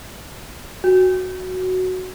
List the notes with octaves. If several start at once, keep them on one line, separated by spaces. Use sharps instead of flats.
F#4